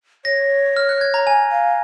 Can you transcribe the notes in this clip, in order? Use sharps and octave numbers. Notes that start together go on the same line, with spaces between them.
C#5 A#6
F6
F#6
G#6
A#5
G#5
F5